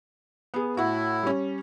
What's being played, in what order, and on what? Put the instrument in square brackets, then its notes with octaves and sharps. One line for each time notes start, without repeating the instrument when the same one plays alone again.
[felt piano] B3 G#4
[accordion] A2 E4 [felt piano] F#4 F#5
[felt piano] G3 C#4